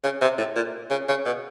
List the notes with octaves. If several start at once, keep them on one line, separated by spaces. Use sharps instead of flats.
C#3
C3
A2
A#2
C#3
C#3
B2